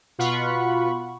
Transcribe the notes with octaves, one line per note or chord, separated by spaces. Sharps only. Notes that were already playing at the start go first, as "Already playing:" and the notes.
B2 F4 F#5 B5 C#6